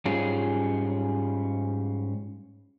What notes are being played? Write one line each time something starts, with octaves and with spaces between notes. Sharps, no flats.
G#2 G3 C#4 F4 G#4